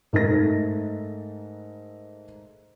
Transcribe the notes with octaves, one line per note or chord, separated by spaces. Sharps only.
G#2 A3 D#4 A4 A#4 A#6